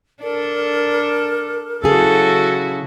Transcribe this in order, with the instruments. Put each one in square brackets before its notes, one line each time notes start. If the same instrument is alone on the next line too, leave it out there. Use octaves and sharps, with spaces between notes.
[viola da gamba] D4 A4 [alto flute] A#4
[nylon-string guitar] C#3 G#4 [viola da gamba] F#3 E4 F#4 [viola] A4